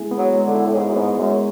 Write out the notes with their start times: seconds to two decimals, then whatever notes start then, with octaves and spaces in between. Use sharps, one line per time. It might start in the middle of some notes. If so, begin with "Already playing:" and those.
Already playing: G#3 B3 E4 G#4
0.11 B3
0.18 F#3
0.33 G#3
0.47 D3
0.54 E4
0.66 A2
0.75 G#2 G#4
0.89 F#2
0.96 G#2 B3
1.18 F#2 G#3